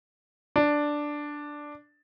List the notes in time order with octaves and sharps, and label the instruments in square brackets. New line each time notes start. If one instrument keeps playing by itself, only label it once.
[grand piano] D4